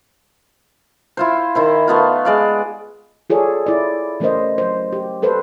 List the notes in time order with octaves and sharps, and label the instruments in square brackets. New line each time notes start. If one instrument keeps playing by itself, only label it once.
[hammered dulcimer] E4 F4 C5
D#3 E4 C5
A3 B3 F4
G#3 D5 F5
[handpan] F4 G#4 A4 C#5 D5
E4 D5
E3 A3 C#4 A#4 C5 D#5
F#3 C5
G4
G4 A4 B4 C5